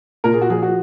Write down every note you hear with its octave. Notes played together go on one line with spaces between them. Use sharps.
A#2 A#4
G#4
F#4
F3 G#4
F#4